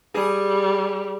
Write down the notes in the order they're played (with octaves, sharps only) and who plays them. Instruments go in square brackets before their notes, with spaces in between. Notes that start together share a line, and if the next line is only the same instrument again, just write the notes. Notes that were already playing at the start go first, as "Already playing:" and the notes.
[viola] G3 [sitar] G#4